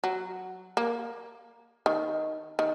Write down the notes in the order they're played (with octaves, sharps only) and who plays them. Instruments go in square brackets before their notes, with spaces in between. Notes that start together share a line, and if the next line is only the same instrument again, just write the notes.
[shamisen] F#3
A#3
D#3
D#3